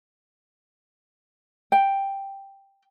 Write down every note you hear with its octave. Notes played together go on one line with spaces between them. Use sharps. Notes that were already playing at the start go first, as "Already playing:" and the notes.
G5